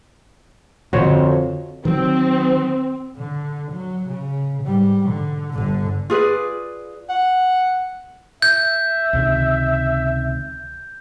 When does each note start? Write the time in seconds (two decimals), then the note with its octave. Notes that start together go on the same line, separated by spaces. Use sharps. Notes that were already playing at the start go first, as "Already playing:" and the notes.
0.93 F2 D3 C4 F#4 C5 C#5
1.85 D#3 F#3 C4
3.16 D3
3.72 F#3
4.08 C#3
4.62 G#2 G3
5.10 D3
5.53 G1 D3
6.10 F4 G#4 B4 D5
7.09 F#5
8.42 E5 G6
9.13 C#2 C3 D#3